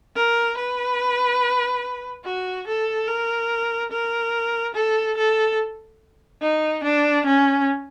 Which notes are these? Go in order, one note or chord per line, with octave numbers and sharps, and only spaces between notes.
A#4
B4
F#4
A4
A#4
A#4
A4
A4
D#4
D4
C#4